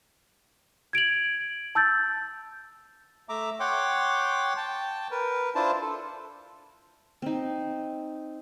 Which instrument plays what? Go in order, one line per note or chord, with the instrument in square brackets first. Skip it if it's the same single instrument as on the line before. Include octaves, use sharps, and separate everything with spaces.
[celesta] G#6 D7 F7 F#7
A5 E6 G6 A6
[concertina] A3 E5 A#5 D6
C#5 F#5 G5 C6 D6
G5 A5
A#4 B4
D4 E4 F4 C5 A5
A4
[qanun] C4 D#4